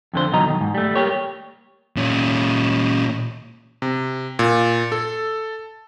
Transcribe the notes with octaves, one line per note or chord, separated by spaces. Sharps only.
F2 D3 C5
B2 D3 D#3 F#3 D#5 A#5
D#3
G#2
G3 A3
A#3 G4 C#5
A#2 C#4
C3
A#2
A4